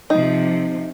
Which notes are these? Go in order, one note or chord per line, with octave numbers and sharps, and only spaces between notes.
C3 F3 D#4